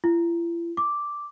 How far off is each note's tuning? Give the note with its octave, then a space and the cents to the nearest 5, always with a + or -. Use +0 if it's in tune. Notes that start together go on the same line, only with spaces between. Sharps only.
E4 +45
D6 -5